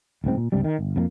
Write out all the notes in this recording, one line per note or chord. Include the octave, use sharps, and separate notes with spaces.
D1 C#2 G#2 C4
A#2
C#2 G2 C3 G3
D#3
G1
F2 F3 A#3